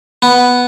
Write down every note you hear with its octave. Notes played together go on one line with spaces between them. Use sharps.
B3